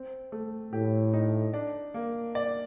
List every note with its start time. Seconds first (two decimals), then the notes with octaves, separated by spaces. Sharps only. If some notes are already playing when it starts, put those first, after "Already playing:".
Already playing: C4
0.32 A3
0.73 A2 G4
1.13 D#4
1.54 D4
1.94 A#3
2.35 D5